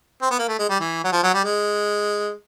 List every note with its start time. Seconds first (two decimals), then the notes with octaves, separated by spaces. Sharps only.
0.22 C4
0.31 B3
0.39 A#3
0.48 A3
0.59 G#3
0.70 G3
0.80 E3
1.04 F#3
1.12 F3
1.23 F#3
1.34 G3
1.44 G#3